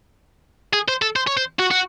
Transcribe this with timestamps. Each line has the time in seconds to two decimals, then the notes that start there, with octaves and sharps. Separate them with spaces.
0.73 G#4
0.88 C5
1.02 A4
1.16 C5
1.27 C#5
1.37 C5
1.59 F#4
1.71 F#4